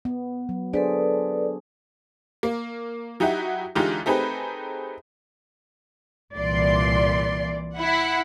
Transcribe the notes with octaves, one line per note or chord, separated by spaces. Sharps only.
B3
F#3
D4 G#4 A4 B4 C5 D5
A#3
F#3 D#4 E4 F#4 G4
D3 E3 G#3 D#4 F4 G4
A3 C4 D#4 G4 G#4 B4
C2 A#2 E3 D5 C6
E4 F#5